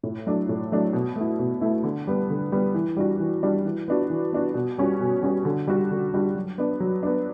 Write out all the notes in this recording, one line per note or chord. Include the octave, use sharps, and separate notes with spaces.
A2
F#3 A3 D4
A2
F#3 A3 D4
B2
A3 E4
B2
A3 E4
D3
G3 B3
D3
G3 B3
E3
G3 D4 F#4
E3
G3 D4 F#4
E3
B3 D4 F#4
E3
B3 D4 F#4
B2
G3 C#4 F#4
B2
G3 C#4 F#4
D3
G3 D4 F#4
D3
G3 D4 F#4
F#3
B3 D4
F#3
B3 D4